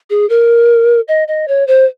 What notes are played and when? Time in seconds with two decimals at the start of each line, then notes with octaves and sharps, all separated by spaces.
0.10 G#4
0.30 A#4
1.08 D#5
1.28 D#5
1.48 C#5
1.67 C5